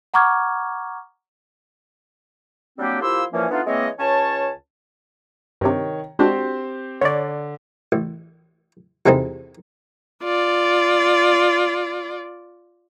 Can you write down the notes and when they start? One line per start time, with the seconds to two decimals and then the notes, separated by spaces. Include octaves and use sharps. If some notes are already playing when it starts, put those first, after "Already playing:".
0.14 F#5 A#5 C#6 D6 F6 G#6
2.78 F#3 G3 A#3 C4 D4 G4
3.00 F3 A#3 E4 G4 C6 E6
3.32 A#2 E3 F3 A#3 C#4
3.51 A3 B3 D4 D#4 F4
3.66 E3 G#3 A#3 C4 C#5 D#5
3.99 C#2 C#4 C#5 A5
5.61 G2 C3 D#3 C#5
6.19 G#3 C4 D4 F#4 G4 C5
7.01 D3 C#5 D5
7.92 A1
9.06 E2 C3 G#3 C4 D#4 A4
10.23 F4 D5